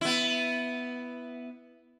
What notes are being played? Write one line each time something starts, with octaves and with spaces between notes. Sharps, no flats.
B3 E4